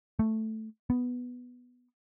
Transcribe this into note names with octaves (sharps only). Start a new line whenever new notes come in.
A3
B3